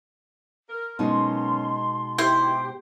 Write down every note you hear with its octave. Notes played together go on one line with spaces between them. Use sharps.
A#4
B2 D#3 F#3 G#3 C#4 D#4 C6
E4 G4 C5 G5